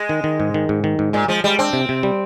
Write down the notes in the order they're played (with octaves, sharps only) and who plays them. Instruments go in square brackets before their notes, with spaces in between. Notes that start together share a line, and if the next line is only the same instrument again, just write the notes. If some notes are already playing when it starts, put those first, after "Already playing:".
Already playing: [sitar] G#3
[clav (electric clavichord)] D#3
D#3
G#2
D#3
G#2
D#3
G#2
[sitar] A#2 [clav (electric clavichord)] G#3
[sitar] F3 [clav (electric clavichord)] G#3
[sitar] G3 [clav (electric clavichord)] G#3
[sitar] C4 [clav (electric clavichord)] D4
[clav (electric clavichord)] C3
C3
G3